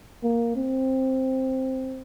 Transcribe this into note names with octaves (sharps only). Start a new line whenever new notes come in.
A#3
C4